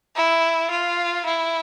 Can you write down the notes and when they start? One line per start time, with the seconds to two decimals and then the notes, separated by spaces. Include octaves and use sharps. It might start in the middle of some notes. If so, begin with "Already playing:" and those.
0.16 E4
0.71 F4
1.26 E4